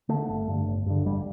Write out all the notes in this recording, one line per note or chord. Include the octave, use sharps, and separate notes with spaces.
D3 A3
G1
G2 D3
G1
G2 D3
G1 G3